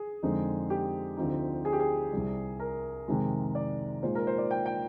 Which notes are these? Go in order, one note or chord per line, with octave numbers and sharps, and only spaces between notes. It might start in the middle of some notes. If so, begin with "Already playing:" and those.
Already playing: G#4
F2 D3 G#3 C4 D#4
G4
D2 D3 F3 C4 D#4
G#4
G4
G#4
C2 C3 G3
A#4
F2 C3 D#3 G#3 C4
D5
A#2 G#3 D#4 C5
A#4
C5
D5
G5
G5